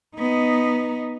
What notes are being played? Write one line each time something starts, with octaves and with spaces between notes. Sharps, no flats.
B3 D#4